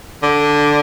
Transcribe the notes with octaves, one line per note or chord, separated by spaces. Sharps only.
D3